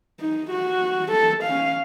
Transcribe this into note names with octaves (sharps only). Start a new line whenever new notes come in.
D#4
F#4
A4
C#4 F5